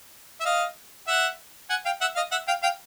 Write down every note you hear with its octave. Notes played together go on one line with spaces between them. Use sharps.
E5
D#5 F5
E5 F#5
F#5 G#5
F5 G5
E5 F#5
D#5 F5
E5 F#5
F5 G5
F5 G5